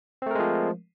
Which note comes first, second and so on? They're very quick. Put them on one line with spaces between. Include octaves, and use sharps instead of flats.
C4 A3 A#4 G#3 F3